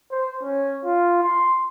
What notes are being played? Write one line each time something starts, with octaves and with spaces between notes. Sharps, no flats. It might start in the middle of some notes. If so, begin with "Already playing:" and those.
C5
C#4
F4
C6